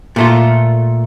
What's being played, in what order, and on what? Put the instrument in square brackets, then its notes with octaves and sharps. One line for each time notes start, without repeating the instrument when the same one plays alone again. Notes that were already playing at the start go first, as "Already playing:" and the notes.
[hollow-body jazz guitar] A#2 A3 F4